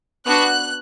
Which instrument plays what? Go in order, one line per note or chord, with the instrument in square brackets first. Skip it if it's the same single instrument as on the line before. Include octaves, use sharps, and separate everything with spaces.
[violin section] B3 D4 F#4 F#6